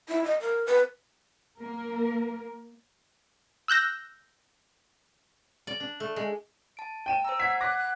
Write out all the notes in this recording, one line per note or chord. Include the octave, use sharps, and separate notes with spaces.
E4
D#5
A#4
B4
A#3 A#4
E6 F#6 G6 A#6
D5
D4
A3
G#3
A5 D7
G5 D#7 E7
C5 A#5 E6
F#5 G#6 B6
D6 F#6 A#6
F#6